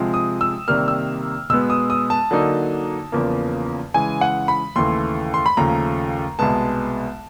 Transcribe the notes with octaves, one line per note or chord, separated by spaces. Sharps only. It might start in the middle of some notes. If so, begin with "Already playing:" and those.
Already playing: C3 F3 G#3
D#6
E6
C3 D#3 G3 A#3 F6
E6
B2 G#3 B3 E6
D#6
D#6
A5
D3 F#3 A#3 D#4
E2 C#3 F3 A#3
C#3 E3 G#3 G#5
F#5
B5
D#2 C#3 E3 A3 C6
C6
B5
D#2 C#3 F3 A3 A#5
C2 B2 G#3 B3 A5